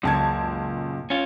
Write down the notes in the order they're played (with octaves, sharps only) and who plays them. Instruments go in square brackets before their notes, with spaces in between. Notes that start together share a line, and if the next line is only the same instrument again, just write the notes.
[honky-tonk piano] C#2 A5 G#6 [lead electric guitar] F#2 A#2
[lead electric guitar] C#4 F4